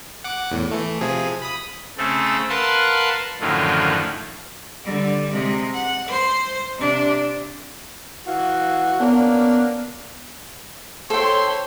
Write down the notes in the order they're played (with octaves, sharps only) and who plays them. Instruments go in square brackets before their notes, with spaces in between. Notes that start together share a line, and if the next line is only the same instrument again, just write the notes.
[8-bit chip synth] F#5 D6
E2 A2
E3 A3
C3 F3 G#4
B5 D#6
[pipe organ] C#3 A3 C4 A4
A#4 B4 F5 F#5 A5 C6
F#2 A2 D3 D#3 F3
[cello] D3 G3
C3 G#3
F#5
C5
C3 D4
[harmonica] E3 F#4 [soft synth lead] F5
[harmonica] A#3 C#4 D4 [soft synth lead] B3
[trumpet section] E4 C6 [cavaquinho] A4 G5 [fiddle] C5 C#5